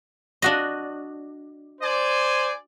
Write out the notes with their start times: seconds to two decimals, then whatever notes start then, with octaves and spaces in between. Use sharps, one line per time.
0.42 D4 F#4 D#5
1.81 C5 D5 G#5